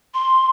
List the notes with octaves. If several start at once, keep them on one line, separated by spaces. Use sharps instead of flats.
C6